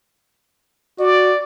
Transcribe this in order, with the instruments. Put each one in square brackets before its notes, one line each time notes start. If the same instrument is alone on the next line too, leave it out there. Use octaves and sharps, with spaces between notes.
[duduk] F#4 [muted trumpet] D5